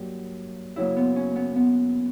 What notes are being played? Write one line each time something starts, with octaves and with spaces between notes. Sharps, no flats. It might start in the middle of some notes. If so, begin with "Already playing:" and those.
Already playing: G2 F#3 A#3 G4
F#2 C#3 F#3 A#3 E4
B3
C#4
B3
B3